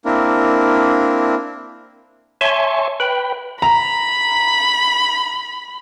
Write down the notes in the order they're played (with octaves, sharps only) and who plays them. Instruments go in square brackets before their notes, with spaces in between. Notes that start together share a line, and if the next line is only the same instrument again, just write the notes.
[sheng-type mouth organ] A#3 C4 D4 E4 A#4
[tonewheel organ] C#5 E5 G#5 A5 C6 C#6
B4 G5 B5
[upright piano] A#5 [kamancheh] B5